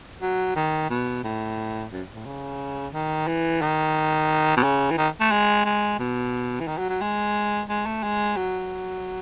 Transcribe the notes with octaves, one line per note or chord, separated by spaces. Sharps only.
F#3
D#3
B2
A2
F#2
A2
C#3
D#3
E3
D#3
B2
C#3
E3
D#3
A3
G#3
G#3
B2
E3
D#3
F#3
F#3
G#3
G#3
A3
G#3
F#3